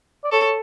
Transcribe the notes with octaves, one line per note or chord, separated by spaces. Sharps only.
D5
A4 C#5